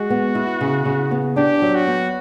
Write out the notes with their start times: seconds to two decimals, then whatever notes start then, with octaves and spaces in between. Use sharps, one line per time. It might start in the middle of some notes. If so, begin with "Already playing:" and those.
Already playing: G#3 F#4
0.10 B3
0.35 E4
0.61 C#3
0.85 C#3
1.11 B3
1.36 D4 G4
1.62 F#3
1.75 F#4
1.87 B3